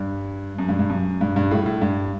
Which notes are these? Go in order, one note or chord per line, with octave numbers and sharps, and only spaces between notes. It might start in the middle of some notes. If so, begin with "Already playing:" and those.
Already playing: G2
F#2
G2
G2
F#2
G2
G2
A2
A2
G2